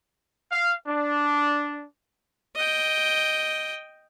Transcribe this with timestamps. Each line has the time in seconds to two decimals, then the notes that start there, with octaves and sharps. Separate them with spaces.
0.51 F5
0.87 D4
2.56 D#5 G5